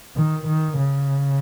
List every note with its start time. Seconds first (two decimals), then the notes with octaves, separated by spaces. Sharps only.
0.16 D#3
0.47 D#3
0.78 C#3